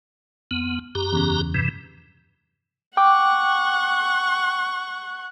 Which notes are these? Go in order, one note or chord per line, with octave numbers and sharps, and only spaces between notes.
F2 B3
F#2 G4 A#5
E2 C#3
G2 C3 E3
F#5 G5 C#6 D6